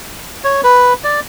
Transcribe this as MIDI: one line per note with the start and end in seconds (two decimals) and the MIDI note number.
0.44 0.61 73
0.64 0.93 71
1.04 1.20 74